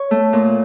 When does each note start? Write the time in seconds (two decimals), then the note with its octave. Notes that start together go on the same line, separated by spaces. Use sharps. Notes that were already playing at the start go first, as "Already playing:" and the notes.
Already playing: C#5
0.11 A3
0.33 A#2